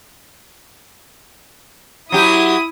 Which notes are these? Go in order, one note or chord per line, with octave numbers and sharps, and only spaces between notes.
F#3 E4 G4 D#6